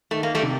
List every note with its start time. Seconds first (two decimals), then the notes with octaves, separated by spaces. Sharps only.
0.11 D#3 A3
0.23 A#3
0.35 G3 A3
0.43 C3